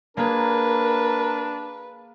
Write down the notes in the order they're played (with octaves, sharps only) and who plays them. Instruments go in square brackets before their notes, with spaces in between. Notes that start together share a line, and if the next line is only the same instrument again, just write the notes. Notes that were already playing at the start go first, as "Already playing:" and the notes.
[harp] A#3 G#4 [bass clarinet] D4 [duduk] A#4 [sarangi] B4